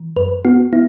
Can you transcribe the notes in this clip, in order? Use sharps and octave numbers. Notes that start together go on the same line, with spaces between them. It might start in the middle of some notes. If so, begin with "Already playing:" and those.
Already playing: E3
F#2 B4
B3 F#4
B3 E4